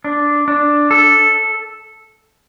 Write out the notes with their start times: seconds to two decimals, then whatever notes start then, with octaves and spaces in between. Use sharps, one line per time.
0.04 D4
0.48 D4
0.91 A4